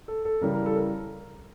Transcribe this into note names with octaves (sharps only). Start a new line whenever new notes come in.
A4
A4
C#3 E3 G3 A#4
A#4
A4
A#4